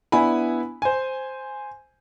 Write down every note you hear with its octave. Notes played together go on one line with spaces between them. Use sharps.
B3 D4 E4 G#5 B5
C5 G#5